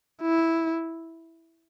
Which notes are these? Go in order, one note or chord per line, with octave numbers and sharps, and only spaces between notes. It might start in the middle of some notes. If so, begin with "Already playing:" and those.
E4